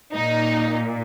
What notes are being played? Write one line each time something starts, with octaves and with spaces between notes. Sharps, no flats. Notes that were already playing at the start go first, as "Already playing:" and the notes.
A#2 D#4